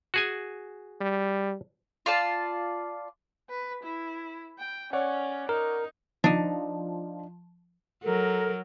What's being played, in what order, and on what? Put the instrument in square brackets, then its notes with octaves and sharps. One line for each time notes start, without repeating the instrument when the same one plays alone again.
[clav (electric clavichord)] F#4 G#4 G#5
[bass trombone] G3
[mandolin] F4 D5 A5
[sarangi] B4
E4
G5
[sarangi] C#4 [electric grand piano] C#5 D5 F#5
[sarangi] D#4 [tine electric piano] A#4
[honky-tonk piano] F3 [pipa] D4 D#4
[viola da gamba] F#3 [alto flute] A4 [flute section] A#4